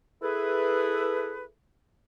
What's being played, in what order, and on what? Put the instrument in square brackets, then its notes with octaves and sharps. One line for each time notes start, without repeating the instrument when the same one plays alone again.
[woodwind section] E4 G#4 A4 B4